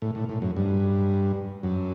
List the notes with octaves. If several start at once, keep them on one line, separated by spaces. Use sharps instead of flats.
A2
A2
A2
F#2
G2
F#2